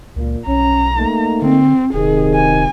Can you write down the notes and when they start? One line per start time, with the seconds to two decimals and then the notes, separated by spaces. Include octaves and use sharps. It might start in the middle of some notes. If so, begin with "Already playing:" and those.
0.16 C#2 A#2
0.47 B1 C#4 A#5
0.97 A3 A#3 D#4
1.42 D3 C4
1.94 D#1 C3 D#3 G#4
2.34 G#5